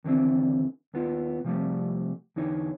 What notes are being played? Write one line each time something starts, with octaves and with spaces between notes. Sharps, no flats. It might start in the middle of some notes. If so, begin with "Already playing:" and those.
D#2 D3 E3 C4
D#2 B3 F4
C3 F3 G3 A3
E2 D3 D#4 C#5